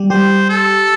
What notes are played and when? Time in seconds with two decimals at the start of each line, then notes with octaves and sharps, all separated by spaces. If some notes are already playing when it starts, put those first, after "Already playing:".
Already playing: G3 G4
0.10 G3 G4 C5
0.49 A4